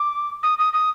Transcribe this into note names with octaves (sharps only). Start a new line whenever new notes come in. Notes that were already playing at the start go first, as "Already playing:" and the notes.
Already playing: D6
D#6
D#6
D#6